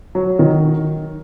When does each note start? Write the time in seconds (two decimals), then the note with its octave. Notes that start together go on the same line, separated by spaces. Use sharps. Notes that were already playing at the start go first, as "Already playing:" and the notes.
0.15 F#3
0.39 D#3